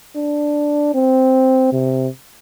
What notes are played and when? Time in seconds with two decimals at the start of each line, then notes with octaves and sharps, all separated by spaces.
0.16 D4
0.94 C4
1.73 C3